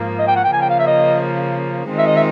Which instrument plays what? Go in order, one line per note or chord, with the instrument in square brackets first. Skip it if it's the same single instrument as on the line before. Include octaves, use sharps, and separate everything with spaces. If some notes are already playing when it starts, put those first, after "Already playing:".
Already playing: [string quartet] G#2 F3 A#3
[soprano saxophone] D#5
G5
F#5
G5
[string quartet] C#3 F3 A#3 [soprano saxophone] G#5
[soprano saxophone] G5
F5
E5
D#5
[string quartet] D#3 G#3 C4 F4
[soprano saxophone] E5
D#5
E5